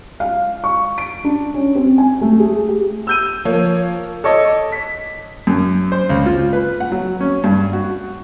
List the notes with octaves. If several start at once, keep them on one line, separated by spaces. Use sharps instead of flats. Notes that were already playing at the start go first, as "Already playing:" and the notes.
F5
C#6
D7
D4
C#4
C4
G#5
A3
G#4
G4
E6 G6 D#7
F3 A#3 C#5
A4 C#5 D#5 D6
B6
F#2
C5
C#2
F4
B4
F#5
F#3
C#4
G2
F#4